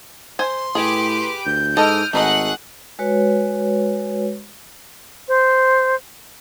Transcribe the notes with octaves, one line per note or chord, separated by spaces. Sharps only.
C5 G#5 C6
A2 G4 G#4 B4 D6
D2 G6
G#2 E3 A4 D#5 D#6 F6 D7
G#1 A3 D#4 G#4 D#5 F#5 F#6
G#3 F#4 B4 C#5
C5